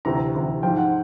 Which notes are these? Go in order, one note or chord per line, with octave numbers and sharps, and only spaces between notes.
D2 C3 E3 A#5
A#5
D2 C3 E3
G#2 F3 G5
F#5